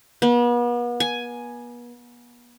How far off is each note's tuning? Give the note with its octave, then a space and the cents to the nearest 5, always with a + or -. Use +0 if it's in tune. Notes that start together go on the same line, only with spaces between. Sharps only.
B3 -40
G#5 +5